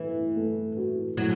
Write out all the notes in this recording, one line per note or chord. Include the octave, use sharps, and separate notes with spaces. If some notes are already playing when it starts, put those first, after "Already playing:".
Already playing: A2 E3 B4
A3
F#4
A2 F#3